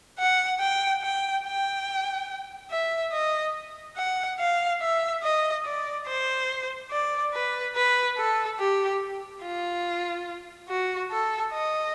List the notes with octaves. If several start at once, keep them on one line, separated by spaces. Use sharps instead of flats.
F#5
G5
G5
G5
E5
D#5
F#5
F5
E5
D#5
D5
C5
D5
B4
B4
A4
G4
F4
F#4
A4
D#5